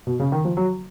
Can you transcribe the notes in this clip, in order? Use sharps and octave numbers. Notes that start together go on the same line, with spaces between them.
B2
C#3
D#3
F3
F#3